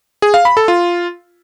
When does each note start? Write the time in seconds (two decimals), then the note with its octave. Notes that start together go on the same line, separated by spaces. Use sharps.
0.22 G#4
0.34 F5
0.45 B5
0.57 A4
0.68 F4